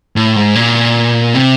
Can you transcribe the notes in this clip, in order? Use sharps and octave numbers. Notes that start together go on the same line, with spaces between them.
A2
G#2
A#2
C3